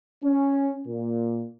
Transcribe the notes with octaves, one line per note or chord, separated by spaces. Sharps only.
C#4
A#2